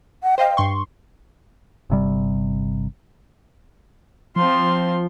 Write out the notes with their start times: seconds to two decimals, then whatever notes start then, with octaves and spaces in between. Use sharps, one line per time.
0.23 F#5
0.38 C5 D#5 F5 G5
0.57 G2 C6 C#6
1.90 G1 C3 G3
4.36 F3 C4 F4 C6